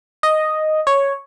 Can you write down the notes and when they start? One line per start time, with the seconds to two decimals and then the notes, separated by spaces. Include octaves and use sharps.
0.23 D#5
0.87 C#5